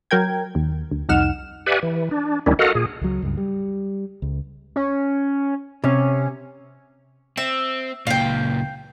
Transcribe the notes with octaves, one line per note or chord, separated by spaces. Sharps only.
F#3 A#4 G5 G#6
D#2
D2
C2 F2 D#4 F#5 F6 E7
G4 B4 D5 E5 F#5 G#5
E3
D4
D2 D#3 G3 C#4 D4 E4
F#4 A4 A#4 D#5 F5 F#5
A#2 G#4
C#2 F#3
C#2 G2
G3
C#2
C#4
C3 C#4
C4 E5
C#2 A#2 F5 G5